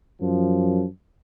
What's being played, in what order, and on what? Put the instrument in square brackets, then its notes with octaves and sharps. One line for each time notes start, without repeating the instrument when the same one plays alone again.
[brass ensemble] F#2 F3